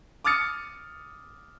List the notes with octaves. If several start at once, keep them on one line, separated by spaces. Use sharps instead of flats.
D6 D#6 F6 A6 C#7